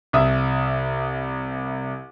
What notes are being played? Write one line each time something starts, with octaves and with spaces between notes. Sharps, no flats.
C2 E5 D#6